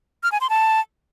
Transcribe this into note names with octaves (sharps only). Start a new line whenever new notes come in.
F6
G#5
C6
A5